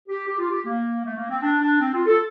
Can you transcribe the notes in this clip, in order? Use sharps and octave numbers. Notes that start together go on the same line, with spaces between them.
G4
G4
F4
G4
A#3
A3
A#3
C4
D4
D4
C4
F4
A4